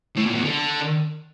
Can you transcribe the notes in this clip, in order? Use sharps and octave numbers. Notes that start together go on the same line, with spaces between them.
A2
A#2
E2
D3